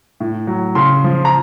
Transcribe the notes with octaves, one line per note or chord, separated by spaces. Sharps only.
A2
F#3
C#3 C6
F3
A#5